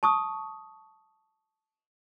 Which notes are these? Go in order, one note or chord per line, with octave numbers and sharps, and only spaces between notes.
A5 C#6 D#6